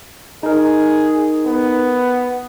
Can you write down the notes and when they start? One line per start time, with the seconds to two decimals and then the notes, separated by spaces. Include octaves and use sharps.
0.43 D#4 G#4 A#4
1.46 B3